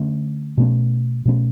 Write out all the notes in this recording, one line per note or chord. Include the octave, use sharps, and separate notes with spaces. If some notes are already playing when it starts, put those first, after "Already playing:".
Already playing: D3 A3 C#4
B2 A3 C#4
B2 A3 C#4